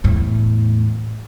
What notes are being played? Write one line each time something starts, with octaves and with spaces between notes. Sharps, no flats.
E2 A2